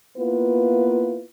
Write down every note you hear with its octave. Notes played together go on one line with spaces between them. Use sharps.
A#3 B3 E4 F4 B4